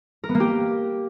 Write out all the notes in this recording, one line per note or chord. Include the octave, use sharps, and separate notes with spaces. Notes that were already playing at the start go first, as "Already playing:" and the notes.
A#4
B3
A#3
G4